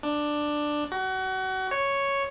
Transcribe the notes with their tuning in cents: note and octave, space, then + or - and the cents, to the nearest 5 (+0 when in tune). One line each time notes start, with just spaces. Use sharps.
D4 +10
F#4 +30
C#5 +0